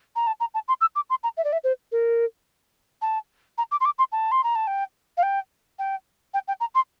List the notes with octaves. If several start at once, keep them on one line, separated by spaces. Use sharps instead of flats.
A#5
A5
A#5
A5
C6
E6
D6
C6
A#5
E5
D5
E5
C5
A#4
A5
A#5
D6
C6
D6
C6
A5
C6
A#5
A5
G5
F5
G5
G5
G5
G5
A#5
C6